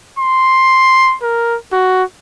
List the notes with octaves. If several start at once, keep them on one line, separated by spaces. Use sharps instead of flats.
C6
A#4
F#4